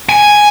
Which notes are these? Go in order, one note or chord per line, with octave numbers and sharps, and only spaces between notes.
G#5